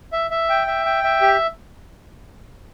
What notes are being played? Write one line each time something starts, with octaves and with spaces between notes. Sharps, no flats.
E5
E5
G5
E5
G5
E5
G4